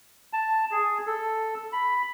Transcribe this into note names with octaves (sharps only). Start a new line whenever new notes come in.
A5
G#4
A4
B5